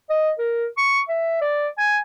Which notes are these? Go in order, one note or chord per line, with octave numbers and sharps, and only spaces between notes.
D#5
A#4
C#6
E5
D5
G#5